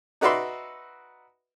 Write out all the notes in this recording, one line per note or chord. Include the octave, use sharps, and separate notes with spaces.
D#4 F#4 B4 D5 E5 C6